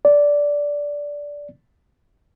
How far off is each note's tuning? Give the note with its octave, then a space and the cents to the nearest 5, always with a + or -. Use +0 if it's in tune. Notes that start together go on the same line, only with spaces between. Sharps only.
D5 -10